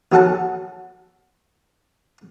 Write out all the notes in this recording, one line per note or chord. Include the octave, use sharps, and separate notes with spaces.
D#2 F#3 F#4 A4 F#5 A5